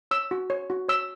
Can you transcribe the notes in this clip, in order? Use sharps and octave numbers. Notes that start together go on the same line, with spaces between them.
C#5 E6
F#4
C#5
F#4
C#5 E6